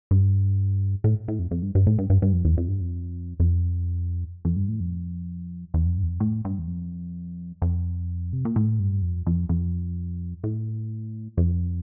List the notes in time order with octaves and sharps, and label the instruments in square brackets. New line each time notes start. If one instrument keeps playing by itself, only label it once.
[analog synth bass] G2
A2
A2
F2
F2
G2
G2
A2
G2
G2
G2
F2
E2
F2
G2
F2
F2
F2
G2
A2
F2
E2
F2
G2
E2
F2
A2
G2
E2
F2
F2
C3
A#2
A2
G2
F2
F2
F2
A2
F2